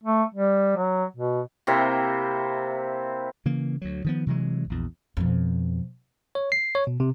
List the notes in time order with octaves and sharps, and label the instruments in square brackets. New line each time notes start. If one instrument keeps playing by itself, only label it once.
[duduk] A3
G3
F#3
B2
[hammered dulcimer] C3 A#3 C4 E4
[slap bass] C#3 E3 A#3
D2 F#3
D#3 F3 B3
C3 E3 F#3 G#3
A#1 E2
[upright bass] F2 B2
[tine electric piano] C#5
C7
C#5
B2
C3